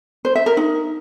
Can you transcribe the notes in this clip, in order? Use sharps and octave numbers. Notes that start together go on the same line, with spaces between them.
C5
E5
A#4
D#4